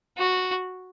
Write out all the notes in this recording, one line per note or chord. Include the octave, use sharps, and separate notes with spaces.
F#4